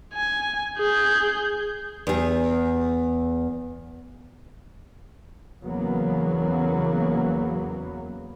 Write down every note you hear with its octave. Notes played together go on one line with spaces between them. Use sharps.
G#5
G#4 G6
E2 G#4
E2 C#3 F#3 A#3 B3